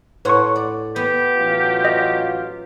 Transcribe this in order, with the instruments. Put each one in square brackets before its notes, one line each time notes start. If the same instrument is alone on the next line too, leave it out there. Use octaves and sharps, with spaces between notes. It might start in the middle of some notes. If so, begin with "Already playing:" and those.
[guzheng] A2 C#5 F#5 [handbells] B4 C6 C#6
[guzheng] D5
[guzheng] B3 [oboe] G4
[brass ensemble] A1 F#3 F4
[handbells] D#5